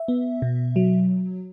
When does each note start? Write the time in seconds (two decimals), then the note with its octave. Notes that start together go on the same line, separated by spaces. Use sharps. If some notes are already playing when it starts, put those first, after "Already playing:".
Already playing: E5
0.08 B3
0.42 B2
0.76 F#3